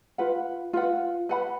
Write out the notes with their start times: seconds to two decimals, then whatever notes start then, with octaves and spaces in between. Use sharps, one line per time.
0.18 F4 B4 F#5
0.73 F4 B4 F#5
1.29 B4 F#5 B5